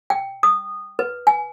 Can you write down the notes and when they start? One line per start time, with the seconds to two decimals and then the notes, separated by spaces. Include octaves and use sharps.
0.10 G5
0.43 D#6
0.99 B4
1.27 G#5